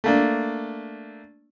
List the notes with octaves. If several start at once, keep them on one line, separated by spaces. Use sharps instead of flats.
A3 A#3 D4